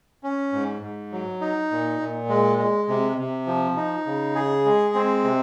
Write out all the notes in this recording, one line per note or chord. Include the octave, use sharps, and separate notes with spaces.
C#4
G#2
G#2
F#3
D#4
A#2
A#2
G#3
G#3
C3
C3
F3
D#4
C#3
G#4
G#3
C4
C3